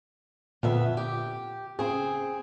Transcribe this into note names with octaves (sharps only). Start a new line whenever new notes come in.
F2 A#2 D3 B3 E5
G4
C#3 C4 G#4